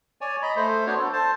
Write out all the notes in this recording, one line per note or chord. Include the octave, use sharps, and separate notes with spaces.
C#5 D5 G#5
D#5 A#5 B5
A3 C5
B3 D4 F#4 C5 C#5
A4
C5 A5